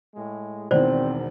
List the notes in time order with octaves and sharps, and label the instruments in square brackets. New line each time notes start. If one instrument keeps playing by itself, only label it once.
[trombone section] A2 G#3
[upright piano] E1 E2 D#3 [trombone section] C4 [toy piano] C5 D5